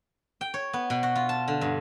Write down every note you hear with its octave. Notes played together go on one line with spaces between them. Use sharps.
G5
C#5
B3
B2
F#4
F4
A5
D3
G2